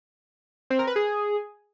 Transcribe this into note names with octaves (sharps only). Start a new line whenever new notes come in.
C4
A#4
B4
G#4